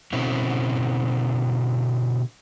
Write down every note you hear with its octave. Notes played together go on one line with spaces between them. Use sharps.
B2 D3 C4 C#4 E4